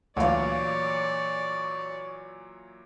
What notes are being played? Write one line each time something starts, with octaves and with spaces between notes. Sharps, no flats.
D2 A#2 E3 F#3 C#5 D5 F5